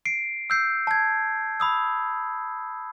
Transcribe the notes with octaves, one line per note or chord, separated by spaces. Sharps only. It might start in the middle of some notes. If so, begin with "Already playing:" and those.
C7 D7
E6 G6 C7
A5 G#6
B5 D#6 E6